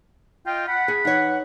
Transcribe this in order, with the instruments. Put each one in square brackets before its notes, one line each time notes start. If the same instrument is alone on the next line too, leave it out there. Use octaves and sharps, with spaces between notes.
[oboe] F4 [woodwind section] D#5 G5
[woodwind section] F#5 [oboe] B5
[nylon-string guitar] G#4
[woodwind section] E3 B4 F#5 [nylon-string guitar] D#4 C#5